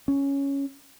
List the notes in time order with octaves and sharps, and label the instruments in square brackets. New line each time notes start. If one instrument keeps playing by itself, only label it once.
[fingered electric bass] C#4